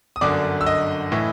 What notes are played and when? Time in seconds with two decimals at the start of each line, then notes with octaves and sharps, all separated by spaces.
0.16 D#6
0.21 G1 F#2 D3 D5 D6
0.61 E6
0.66 D#5 D#6
1.12 A2 E3